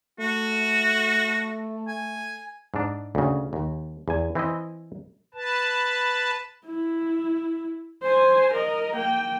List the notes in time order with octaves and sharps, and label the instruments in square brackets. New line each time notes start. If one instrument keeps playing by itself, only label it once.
[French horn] A3 [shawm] F#4
[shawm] G#5
[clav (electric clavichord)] G#2 D4
D2 C#3
D#2
E2 G#5
E3 C4 E4 D#5
[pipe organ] B4 A5
[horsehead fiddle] E4
C5 G#5
A#4 D#5
A#3 G5